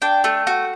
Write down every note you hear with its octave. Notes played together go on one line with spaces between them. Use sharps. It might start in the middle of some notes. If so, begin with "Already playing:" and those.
D4 G5
A3
F#4